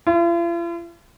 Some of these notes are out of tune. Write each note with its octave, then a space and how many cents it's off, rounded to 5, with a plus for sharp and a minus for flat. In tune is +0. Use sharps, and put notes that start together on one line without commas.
F4 -45